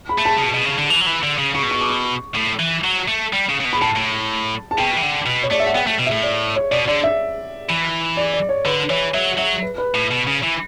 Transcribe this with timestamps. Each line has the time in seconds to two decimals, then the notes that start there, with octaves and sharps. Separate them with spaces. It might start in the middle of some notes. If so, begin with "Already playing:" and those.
0.09 B5
0.18 A3
0.25 A5
0.38 C#3
0.42 B2
0.54 B2
0.66 C#3
0.78 D3
0.90 E3
1.01 F#3
1.06 E3
1.23 D3
1.38 C#3
1.55 C#3 C#6
1.63 B2
1.71 C#6
1.81 D6
1.90 C#6
2.35 A2
2.59 E3
2.84 F#3
3.08 A3
3.33 G3
3.49 C#3
3.60 C#3
3.65 B2
3.73 B5
3.82 A2 A5
3.96 A2
4.71 A5
4.78 B2 G5
4.97 E3
5.02 D3
5.26 B2
5.43 C#5
5.51 A3 D5
5.60 E5
5.66 F#5
5.75 B3 G5
5.87 A3
5.99 B2
6.07 E5
6.11 A2
6.23 D5
6.56 C#5
6.71 B2 D5
6.87 D3 D5
7.03 E5
7.69 E3
8.17 D5
8.33 D5
8.49 C#5
8.65 D3 B4
8.90 E3 C#5
9.14 F#3 E5
9.38 F#3 E5
9.62 B4
9.78 B4
9.95 A2
10.11 B2
10.27 C#3
10.43 E3